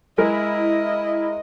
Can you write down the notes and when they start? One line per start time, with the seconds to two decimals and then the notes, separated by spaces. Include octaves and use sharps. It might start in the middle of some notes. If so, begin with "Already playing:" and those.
0.18 G#3 E4 A#4 D#5